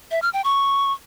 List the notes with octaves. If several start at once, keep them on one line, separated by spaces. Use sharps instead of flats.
E5
F6
G5
C#6